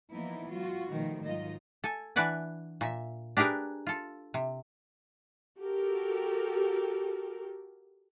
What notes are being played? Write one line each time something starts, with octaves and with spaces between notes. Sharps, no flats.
E3 F3 A#3 B3 D#4 E4
F#3 G#3 F4 F#4
B2 D#3 F3 G3 A3
G#2 D#3 F#3 F4 D#5
A4 G#5
E3 D4 B4 D5 F#5 G#5
A#2 E5
D4 G4 G#4 A#4 B4
F4 A4
C3
F#4 G4 A4 A#4